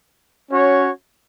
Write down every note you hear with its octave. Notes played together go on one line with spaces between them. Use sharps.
C#4 F#4 C#5